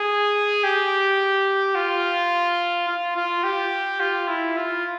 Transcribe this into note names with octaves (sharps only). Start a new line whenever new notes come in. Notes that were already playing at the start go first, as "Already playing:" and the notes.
Already playing: G#4
G4
F4
F4
F4
G4
F4
E4
F4